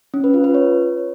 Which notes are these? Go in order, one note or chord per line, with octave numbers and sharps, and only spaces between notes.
C#4
B4
F4
B4
C#5